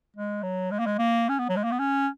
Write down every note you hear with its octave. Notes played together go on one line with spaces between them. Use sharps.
G#3
F#3
G#3
A#3
G#3
A#3
C#4
B3
F#3
G#3
A#3
B3
C#4